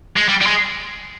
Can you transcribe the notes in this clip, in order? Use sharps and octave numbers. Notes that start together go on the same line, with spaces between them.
G#3
G3
G3
G#3